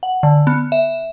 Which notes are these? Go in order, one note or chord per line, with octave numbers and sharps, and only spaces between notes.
F#5
D3
B3
E5